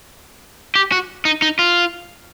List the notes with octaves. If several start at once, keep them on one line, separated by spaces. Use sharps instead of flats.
G4
F#4
D#4
D#4
F4